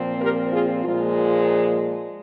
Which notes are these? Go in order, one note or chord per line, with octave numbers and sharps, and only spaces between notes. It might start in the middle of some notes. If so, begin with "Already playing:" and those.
Already playing: A#2 F3 C4
G4 A#4
F4 G#4
A#2 F3 G#3 F4